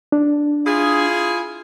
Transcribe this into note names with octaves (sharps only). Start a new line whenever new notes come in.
D4
E4 F4 G#4